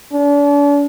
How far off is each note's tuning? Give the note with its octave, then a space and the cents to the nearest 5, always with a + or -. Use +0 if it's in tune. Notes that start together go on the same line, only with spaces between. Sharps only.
D4 -40